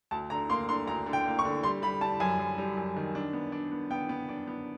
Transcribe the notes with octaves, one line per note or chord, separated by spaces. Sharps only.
D2 A5
D3 A#5
A#3 C6
D3 C6
D2 A#5
D3
G5
A#3
C#6
D3
G3 C6
G3 B5
G3 A5
F#2 G#5
F#2
G3
F#2
D#3
D4
B3
D4
B3
B3 G5
B3
D4
B3